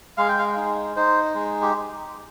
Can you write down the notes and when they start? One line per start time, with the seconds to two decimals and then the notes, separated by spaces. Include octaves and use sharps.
0.18 G#3 F5
0.29 G5
0.39 F5
0.57 D#4
0.96 D#4 C5
1.34 G#3
1.62 G4